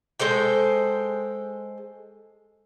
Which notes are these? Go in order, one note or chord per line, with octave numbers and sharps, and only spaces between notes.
G#3 A4 C5 G5